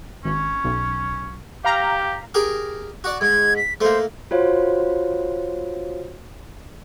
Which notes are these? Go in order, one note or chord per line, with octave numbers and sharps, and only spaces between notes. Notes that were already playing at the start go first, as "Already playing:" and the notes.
G#1 C#4
B1
G4 F5 A#5
G4 G#4 A#4
F#4 D5
G#2 G#6
B6
A3 A#3 C5
F4 F#4 C5 C#5 F5